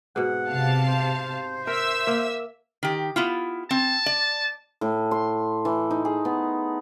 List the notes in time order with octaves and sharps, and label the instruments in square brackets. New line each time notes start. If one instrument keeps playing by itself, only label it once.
[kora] G#2 B2 [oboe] F#5
[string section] C3 F5 A5
[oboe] C5
[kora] A#4 [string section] E5 E6
[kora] A#3
[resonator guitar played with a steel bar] D#3 G4
B3 E4 F4
[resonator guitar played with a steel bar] C4 [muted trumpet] A5
[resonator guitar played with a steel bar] D5
[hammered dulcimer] A2
C6
E3
D#4
G#4
B3